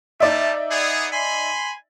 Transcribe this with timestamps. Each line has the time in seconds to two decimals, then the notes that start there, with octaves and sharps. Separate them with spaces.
0.20 G3 A3 D#4 D5 E5 A5
0.70 B3 G#4
1.12 G#5 B5 C6